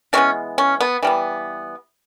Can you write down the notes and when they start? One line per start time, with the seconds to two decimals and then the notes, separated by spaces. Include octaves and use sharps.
0.13 E3 G#3 B3 C#4
0.58 C#4
0.81 B3
1.03 E3 G3 B3